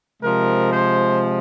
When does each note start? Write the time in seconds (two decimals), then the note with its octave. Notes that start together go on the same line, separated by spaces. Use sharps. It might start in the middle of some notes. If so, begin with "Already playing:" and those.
0.22 C3 F3 G#3 A#4
0.70 C5